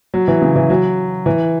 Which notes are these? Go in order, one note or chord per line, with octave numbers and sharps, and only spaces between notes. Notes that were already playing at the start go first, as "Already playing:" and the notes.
F#3
E3
C#3
E3
F#3
E3